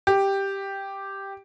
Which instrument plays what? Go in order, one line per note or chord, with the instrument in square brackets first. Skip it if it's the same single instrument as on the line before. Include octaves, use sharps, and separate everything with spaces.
[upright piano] G4